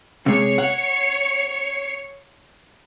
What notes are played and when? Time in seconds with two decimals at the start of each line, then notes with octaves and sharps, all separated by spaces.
0.26 C3 G#3 C#5 C7 C#7
0.58 F#5